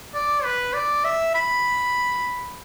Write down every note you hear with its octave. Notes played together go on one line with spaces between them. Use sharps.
D5
B4
D5
E5
B5